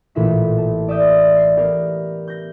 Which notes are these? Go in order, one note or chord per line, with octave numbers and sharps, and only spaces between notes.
A1 A#2 E4 E5 B6
A5
D5 E5 D#6 G6 A6
C7
B3 G4 A#4
G6 A#6